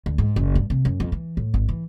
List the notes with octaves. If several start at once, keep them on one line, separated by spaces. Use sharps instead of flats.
D2
G#2
F#1
G2
C3
F#2
F2
E3
A2
G#1
E3